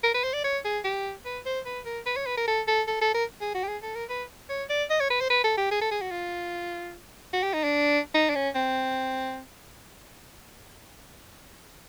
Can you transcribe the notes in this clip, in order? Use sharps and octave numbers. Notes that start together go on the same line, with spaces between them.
A#4
B4
C5
D5
C#5
G#4
G4
B4
C5
B4
A#4
B4
C#5
B4
A#4
A4
A4
A4
A4
A#4
G#4
F#4
G4
G#4
A4
A#4
B4
C#5
D5
D#5
C#5
B4
C5
B4
A4
G4
G#4
A4
G#4
F#4
F4
F#4
G4
D#4
D4
D#4
D4
C#4
C4